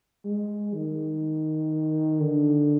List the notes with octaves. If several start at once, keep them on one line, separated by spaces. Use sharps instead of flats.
G#3
D#3
D3